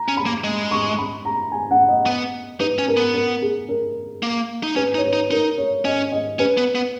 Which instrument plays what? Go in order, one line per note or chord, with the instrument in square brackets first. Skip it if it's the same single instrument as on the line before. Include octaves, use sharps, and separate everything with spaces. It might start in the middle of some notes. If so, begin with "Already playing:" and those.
Already playing: [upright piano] A#5
[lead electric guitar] C#4
[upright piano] B5
[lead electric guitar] A#3
G#3
[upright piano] C#6
B5
A#5
G#5
F#5
D#5
[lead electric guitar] B3
[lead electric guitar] D#4 [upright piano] B4
[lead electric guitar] C#4
[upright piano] A#4
[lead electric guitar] B3
[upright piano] A#4
G#4
A#4
[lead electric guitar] A#3
D#4
[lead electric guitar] C#4 [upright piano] B4
[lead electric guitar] D#4
[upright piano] C#5
B4
[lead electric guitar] D#4
[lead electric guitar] D#4 [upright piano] A#4
[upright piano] C#5
[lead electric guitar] C#4 [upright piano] D#5
[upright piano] D#5
[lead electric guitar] C#4 [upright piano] B4
[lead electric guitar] B3
B3